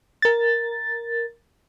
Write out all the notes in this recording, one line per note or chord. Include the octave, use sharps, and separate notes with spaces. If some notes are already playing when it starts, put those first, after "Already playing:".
A#4 A6